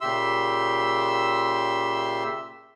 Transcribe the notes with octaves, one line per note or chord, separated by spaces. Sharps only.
A#2 C#3 G4 E5 C6 E6